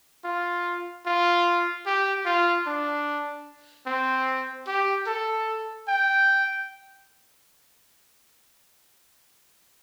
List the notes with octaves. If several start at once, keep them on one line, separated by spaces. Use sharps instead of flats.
F4
F4
G4
F4
D4
C4
G4
A4
G5